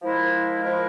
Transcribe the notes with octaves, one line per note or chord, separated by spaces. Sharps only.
F3 G#3 E4 A#4
F3 G#3 E4 A#4